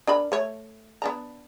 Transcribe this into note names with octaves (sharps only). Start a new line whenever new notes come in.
D4 A#4 B5
A3 C#5
B3 D4 A#5